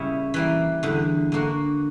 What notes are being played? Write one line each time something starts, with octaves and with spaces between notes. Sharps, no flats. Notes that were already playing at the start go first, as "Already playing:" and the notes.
Already playing: A#2 C#3 G3 C#4 E4
E3 G3 A#3
E2 D3 G3
D3 A#3 D4 F#4